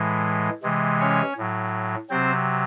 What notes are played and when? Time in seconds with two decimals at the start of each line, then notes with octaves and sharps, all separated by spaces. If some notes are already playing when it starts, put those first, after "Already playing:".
Already playing: A2 E3 G#3
0.63 C3 E3 G#3
1.00 C#4 C#5
1.37 A2 F#3
2.10 C3 F#3 C4 C5